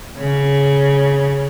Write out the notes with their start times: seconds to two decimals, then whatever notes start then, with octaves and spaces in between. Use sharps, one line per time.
0.17 C#3